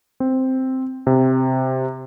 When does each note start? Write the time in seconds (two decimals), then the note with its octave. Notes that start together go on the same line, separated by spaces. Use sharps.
0.20 C4
1.07 C3